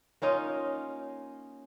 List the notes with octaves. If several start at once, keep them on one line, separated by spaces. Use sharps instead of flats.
A#3 C#4 D#4 F4